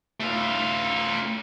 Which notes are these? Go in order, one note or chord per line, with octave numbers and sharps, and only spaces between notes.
A3 F4